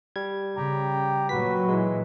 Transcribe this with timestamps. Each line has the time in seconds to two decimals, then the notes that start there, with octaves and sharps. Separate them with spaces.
0.16 G3 G#6
0.57 C#3 G4 G5 A#5
1.29 A#2 F#3 F#4 B4 B6
1.68 E3 G#3